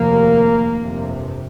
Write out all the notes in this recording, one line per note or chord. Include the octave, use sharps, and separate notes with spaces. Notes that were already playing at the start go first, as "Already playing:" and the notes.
Already playing: F1 D#2 A#3
G1 F2 C3